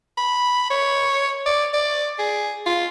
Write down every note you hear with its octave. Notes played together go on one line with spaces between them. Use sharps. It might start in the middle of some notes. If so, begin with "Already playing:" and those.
B5
C#5
D5
D5
G#4
F4